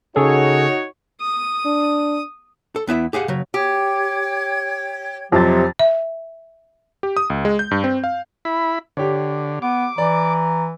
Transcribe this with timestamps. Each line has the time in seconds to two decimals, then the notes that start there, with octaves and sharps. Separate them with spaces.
0.16 C#3 D#4 F#4 G#4 A4 C#5
1.21 D#6
1.66 D4
2.76 A4
2.87 E2 B3 E4 E5
3.13 G4 G#4 F5 F#5
3.28 C#3 F#3
3.54 G4 C#5 G5 G#6
5.32 F2 C3 F#3 A6
5.79 E5
7.03 G4
7.17 D#6
7.30 C#2
7.45 G#3
7.59 G6
7.71 G2
7.84 C4
8.04 F5
8.45 E4 B5
8.97 D3 G4 C#5
9.62 B3 D6
9.98 E3 D5 A#5